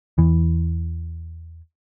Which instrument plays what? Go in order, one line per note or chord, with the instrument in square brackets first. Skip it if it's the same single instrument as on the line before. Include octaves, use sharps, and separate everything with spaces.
[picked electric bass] E2 E3